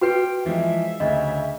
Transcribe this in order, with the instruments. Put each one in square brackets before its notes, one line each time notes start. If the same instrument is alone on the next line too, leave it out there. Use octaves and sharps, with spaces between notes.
[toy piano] F#4 B4 [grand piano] G4 C7 [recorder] G5
[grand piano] E3 F3 G#3 [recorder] E5
[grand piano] D2 C#3 [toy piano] D#5